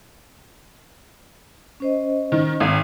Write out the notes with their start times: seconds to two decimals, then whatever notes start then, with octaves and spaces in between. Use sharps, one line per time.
1.80 C#4 C5 D#5
2.32 D#3
2.60 G#1